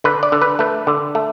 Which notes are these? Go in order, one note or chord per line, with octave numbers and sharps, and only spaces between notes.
D3 B4
D5
D3
B4
A3 B4
D3
A3